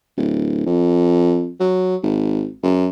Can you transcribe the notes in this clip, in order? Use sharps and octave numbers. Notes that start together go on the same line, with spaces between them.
D1
F2
F#3
G#1
F#2